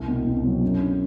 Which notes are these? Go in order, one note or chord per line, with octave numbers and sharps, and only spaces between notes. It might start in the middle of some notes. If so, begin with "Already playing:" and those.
Already playing: C2
B2
C2 C4
B2 F#3
F#2
D3